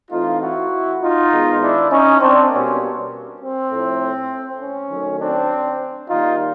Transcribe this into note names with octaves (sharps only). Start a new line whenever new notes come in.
E3 A3 C4 D#4 F4
E4 F#4
D#4 F4
D#3 G#3 B3
D4 E4
C#4 D#4
C4 D4
B2 G3 A#3 C#4
C4
A2 F3 A3
C#4
D#3 F#3 A3
C4 D4
D#3 G3 A#3 D#4 F4